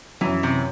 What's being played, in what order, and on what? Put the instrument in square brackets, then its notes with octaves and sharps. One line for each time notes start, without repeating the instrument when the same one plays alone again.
[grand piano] F#2 [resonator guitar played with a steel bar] E3
[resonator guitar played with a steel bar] C3